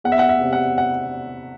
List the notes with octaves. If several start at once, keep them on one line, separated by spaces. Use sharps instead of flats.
E2 F#5
E5
F#5
E5
C3
F#5
F#5